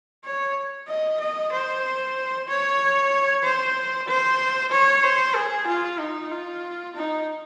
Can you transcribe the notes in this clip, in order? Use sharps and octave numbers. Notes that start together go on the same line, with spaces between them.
C#5
D#5
D#5
C5
C#5
C5
C5
C#5
C5
G#4
F4
D#4
F4
D#4